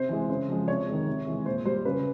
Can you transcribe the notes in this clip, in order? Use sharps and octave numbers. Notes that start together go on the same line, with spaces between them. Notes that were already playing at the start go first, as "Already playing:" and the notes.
Already playing: C3 C5
E3 G#3
C#3 C5
F3 G#3
C3 C#5
D#3 G#3
C3
E3 G#3
A#2 C5
G3 C5
C#3 B4